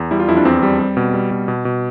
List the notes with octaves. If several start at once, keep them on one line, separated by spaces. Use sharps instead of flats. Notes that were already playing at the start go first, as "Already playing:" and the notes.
Already playing: E2
G3 E4
F4
F2 E4
D4
E2 C4
G3
G3
B2
G3
B2
B2
B2